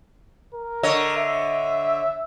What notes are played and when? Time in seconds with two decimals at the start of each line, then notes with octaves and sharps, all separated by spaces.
0.54 A#4
0.83 D3 C#5 D#5
1.17 E5